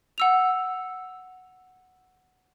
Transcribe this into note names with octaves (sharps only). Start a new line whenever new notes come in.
F#5 E6 F7